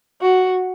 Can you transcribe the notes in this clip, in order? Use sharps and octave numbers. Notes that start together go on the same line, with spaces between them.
F#4